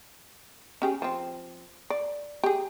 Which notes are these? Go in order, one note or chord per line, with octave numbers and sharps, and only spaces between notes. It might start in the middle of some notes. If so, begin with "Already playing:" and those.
C#4 G4 G#4
F3 C4
D5
G4 G#4